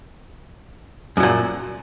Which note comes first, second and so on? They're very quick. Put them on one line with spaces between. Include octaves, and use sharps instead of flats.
F#2 F#3 A#2